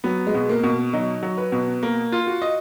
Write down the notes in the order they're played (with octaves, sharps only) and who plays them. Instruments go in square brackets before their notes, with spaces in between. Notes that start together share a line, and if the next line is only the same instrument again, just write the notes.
[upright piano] F#3 [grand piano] B3
[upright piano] G#3
[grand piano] B2
[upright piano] A#3
[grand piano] B2
[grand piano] F#3 [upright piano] D#4
[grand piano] F#3
[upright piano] B4
[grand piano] B2
[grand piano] A#3 [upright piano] A#4
[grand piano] F4
[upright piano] F#4
[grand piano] D#5